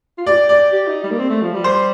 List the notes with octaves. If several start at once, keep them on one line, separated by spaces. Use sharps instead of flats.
F4
G4 D5
D5
G4
D#4
G3
A#3
C4
A3
F3
G3
C5